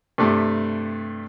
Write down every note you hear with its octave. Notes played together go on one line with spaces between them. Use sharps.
G2 C3 A3 D6